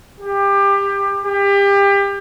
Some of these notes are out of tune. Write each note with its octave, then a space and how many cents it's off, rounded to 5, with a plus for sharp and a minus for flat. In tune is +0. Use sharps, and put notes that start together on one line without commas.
G4 +25
G4 +30